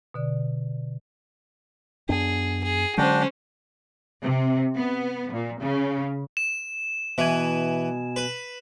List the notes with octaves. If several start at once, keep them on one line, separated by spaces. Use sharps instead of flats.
B2 D3 D5
F#2 B3 D4 G#4
G#4
D3 F#3 G#3 C#4 D4 F#4 C5 G5
C3
B3
A#2
C#3
E7
B2 E3 G#5
B4